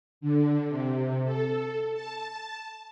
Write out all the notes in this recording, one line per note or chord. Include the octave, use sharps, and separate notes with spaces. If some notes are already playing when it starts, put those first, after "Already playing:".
D3
C3
A4
A5